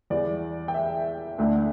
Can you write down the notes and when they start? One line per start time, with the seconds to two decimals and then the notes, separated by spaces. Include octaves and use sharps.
0.10 E2 E3 G3 D5
0.68 G5
0.74 E5
1.38 D2 D3 A3